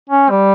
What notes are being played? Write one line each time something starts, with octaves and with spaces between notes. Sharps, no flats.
C#4
G3